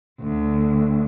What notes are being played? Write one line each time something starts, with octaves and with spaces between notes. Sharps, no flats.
D2